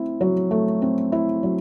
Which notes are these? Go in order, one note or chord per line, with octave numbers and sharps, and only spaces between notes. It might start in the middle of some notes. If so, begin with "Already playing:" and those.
Already playing: A3 C4 E4
F#3
A3
C4
E4
F#3